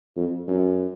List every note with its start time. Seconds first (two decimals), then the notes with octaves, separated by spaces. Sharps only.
0.16 F2
0.48 F#2